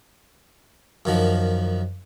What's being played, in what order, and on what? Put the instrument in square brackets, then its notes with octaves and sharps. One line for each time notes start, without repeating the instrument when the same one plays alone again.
[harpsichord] F#2 D#3 F3